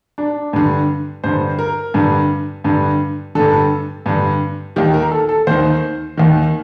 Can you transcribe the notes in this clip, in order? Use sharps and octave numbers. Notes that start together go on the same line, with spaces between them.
D4
G2 D3
G2 D3 C5
A#4
G2 D3
G2 D3
G2 D3 A4
G2 D3
D#2 D#3 G4
A#4
A4
A4
D#2 D#3 C5
D#2 D#3